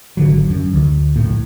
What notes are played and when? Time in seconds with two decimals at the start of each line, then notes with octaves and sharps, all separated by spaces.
0.17 G#1 D3 F#3
0.49 F#2
0.73 D2
1.16 A#1 A2